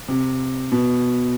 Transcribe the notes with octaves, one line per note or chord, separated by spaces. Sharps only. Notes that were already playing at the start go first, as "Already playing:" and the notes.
C3
B2